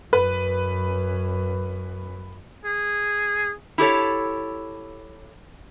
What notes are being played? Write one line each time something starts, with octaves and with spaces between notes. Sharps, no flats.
F#2 B4
G#4
E4 G4 A4 C#5